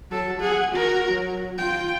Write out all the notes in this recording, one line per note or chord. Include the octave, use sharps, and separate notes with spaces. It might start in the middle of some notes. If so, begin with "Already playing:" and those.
F#3 A4
G#4 F#5
F#4 A#4
F#3
F4 G5